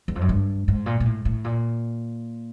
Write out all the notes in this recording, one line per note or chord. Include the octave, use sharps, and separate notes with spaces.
E2
F2
F#2
G2
G#2
A#2
A#2
A2
A2
A#2